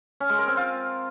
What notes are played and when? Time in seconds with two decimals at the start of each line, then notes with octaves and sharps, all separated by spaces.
0.20 C#4
0.30 G#3
0.39 A#4
0.48 C4
0.57 F4